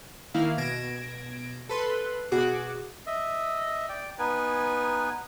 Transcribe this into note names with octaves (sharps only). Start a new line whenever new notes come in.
D#3 A#3 E4 F5
B2 G#6 A#6 D7 E7
A4 B4 C6
B2 F#4 G#4 D6
D#5 E5
D5 G5
B3 D#4 B4 G#5